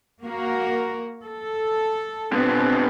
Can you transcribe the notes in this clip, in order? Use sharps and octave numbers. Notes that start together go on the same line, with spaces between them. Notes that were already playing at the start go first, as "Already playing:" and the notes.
A#3 F#4 A#4
A4
B2 D3 B3 C4